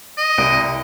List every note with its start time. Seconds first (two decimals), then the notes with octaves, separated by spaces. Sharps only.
0.18 D#5
0.38 C2 D7